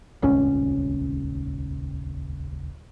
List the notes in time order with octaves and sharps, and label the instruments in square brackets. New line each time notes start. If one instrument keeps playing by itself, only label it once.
[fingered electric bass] D#1 G#1 C#2 C#4